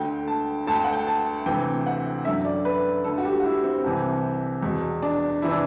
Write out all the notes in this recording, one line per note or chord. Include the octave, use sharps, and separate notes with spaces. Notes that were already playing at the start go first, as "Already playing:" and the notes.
Already playing: D2 D3 G5
A5
D2 D3 A5
G5
F#5
G5
A5
D2 C3 E3 G5
F#5
F#2 D3 E5
D5
B4
D2 D3 A4
F#4
G4
F#4
E4
C4
C2 C3 E3
E2 B2
D4
C3 E3 E4
D4